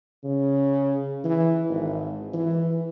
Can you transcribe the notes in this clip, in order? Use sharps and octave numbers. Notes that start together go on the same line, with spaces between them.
C#3
E3
G#1
E3